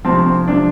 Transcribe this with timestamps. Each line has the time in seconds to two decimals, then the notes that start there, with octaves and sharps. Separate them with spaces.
0.05 D2 C3 F3 C4
0.25 C4
0.47 C3 F3 D4